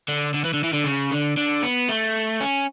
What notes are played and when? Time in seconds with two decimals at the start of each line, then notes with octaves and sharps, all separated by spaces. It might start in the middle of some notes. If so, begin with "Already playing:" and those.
0.08 D3
0.34 D3
0.44 E3
0.54 D3
0.64 E3
0.73 D3
0.85 C#3
1.12 D3
1.37 D3
1.63 B3
1.89 A3
2.41 C#4